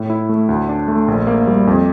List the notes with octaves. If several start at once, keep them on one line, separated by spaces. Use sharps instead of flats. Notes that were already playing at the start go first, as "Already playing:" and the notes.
Already playing: A2
E4
A3
D2
D4
A3
A#1
A#3
G3
F2